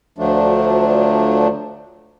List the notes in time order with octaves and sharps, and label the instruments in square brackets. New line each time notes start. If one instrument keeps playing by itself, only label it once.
[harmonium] D2 F3 F#3 A3 D4